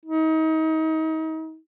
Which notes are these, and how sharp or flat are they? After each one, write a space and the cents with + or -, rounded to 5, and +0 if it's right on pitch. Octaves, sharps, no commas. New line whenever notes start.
D#4 +35